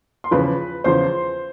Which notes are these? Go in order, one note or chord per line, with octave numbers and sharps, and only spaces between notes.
C6
E2 C#3 F3 B4 B5
E2 C#3 F3 C5 C6